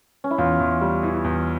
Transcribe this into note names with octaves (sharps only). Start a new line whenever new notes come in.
C#4
E4
E2 F4
E2
G3
E3
E2